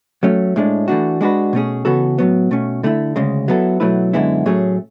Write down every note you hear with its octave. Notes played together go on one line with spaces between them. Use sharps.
F#3 A3 C#4
A2 G#3 D4
E3 A3 D4 F#4
G#3 D4 F#4 B4
B2 A3 C#4 G#4
C#3 E3 B3 F#4 A4
A2 F#3 B3
B2 A3 C#4
D3 A3 E4
D2 C#3 G#3
F#3 B3 E4 A4
B2 F#3 A3 E4 B4
F#2 D3 G#3 B3 E4
A2 F#3 A3 C#4 G#4